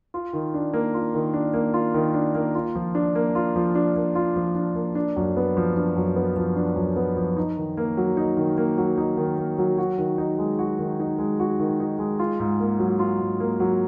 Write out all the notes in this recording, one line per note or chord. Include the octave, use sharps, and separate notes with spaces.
F4
D#3
D4
A#3
F4
D#3
D4
A#3
F4
D#3
D4
A#3
F4
F3
D4
A#3
F4
F3
D4
A#3
F4
F3
D4
A#3
D4
F#2
B3
F3
D4
F#2
B3
F3
D4
F#2
B3
F3
D#4
D#3
A#3
F#3
D#4
D#3
A#3
F#3
D#4
D#3
A#3
F#3
F#4
D#3
D#4
G#3
F#4
D#3
D#4
G#3
F#4
D#3
D#4
G#3
F4
G#2
A#3
F#3
F4
G#2
A#3
F#3